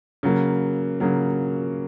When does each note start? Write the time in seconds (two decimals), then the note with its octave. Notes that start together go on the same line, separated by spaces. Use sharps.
0.23 C#3 F#3 A#3
1.00 C#3 F#3 A#3